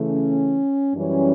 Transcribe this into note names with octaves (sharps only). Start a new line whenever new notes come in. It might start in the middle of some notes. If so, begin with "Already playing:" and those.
Already playing: C#3 E3 A3
C#4
F#2 E3 G3 C#4